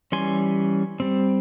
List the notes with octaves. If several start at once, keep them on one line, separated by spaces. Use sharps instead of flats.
E3 G3 C#4 G#5 C6
G3 C4